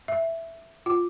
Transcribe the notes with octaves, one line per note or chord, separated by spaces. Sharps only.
E5
F4